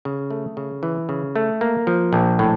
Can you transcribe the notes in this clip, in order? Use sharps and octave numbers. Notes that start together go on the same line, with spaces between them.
C#3
A3
C#3
E3
C#3
A3
A#3
F3
A#1
A2